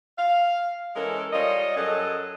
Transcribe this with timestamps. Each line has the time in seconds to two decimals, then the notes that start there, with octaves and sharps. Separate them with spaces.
0.17 F5
0.95 E3 G#3 C#4 A4 A#4
1.32 G3 F4 C#5 D#5
1.76 F#2 F#3 C#4 G#4 A4 D#5